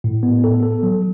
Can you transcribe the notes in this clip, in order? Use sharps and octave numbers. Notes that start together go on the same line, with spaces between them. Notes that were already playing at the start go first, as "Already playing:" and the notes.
A2
B3
A4
A4
F#3